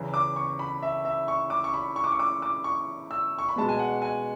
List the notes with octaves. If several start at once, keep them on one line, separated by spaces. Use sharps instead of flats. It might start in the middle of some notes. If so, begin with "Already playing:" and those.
Already playing: E2 C#3 E3
D6
C#6
B5
E5
E5
C#6
D6
C#6
B5
C#6
D6
C#6
D6
D6
C#6
E6
C#6
B5
B2 G#3 B3 A5
G#5
F#5
G#5